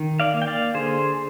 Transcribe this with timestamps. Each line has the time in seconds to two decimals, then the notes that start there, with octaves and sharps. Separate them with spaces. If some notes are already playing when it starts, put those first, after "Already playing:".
Already playing: D#3
0.20 D5 F5
0.34 A#3
0.42 G5
0.47 D5 F5
0.74 D3 G#4 C5